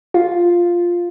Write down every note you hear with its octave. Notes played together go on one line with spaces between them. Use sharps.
F4